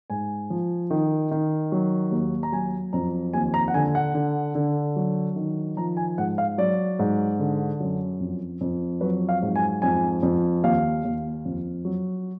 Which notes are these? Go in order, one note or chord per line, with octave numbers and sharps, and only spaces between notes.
G#2 G#5
F3
D#3
D#3
F#3
D#2
A#5
F#3 G#5
F2 A#5
D#2 G#5
A#5
F#5
D3 G#5
F#5
D3
D3
F#3
D#3
F3 A#5
G#5
G#2 F#5
F5
F#3 D5
G#2
D3
F#2
F2
F2
F#3 B4
F5
G#2
G#5
F2 G#5
F2
D#2 F5
D#2
F2
F#3